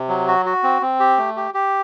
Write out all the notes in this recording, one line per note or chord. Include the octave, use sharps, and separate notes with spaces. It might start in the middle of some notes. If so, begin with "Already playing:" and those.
Already playing: C3
F#3
F#4
F#4
C4
C4
G4
A3
G4
G4